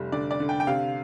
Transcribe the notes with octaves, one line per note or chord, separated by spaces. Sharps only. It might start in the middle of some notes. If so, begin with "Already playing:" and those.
Already playing: F1 G3
D3 D5
D5
D3
G5
G5
C3 F5